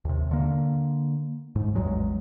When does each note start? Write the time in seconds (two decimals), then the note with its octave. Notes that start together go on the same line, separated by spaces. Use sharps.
0.05 D#2 C3
0.31 D3 A#3
1.56 G#2
1.75 A1 E2 F#3 G#3